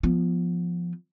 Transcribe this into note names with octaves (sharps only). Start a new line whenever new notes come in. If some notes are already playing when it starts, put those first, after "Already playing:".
F3 B3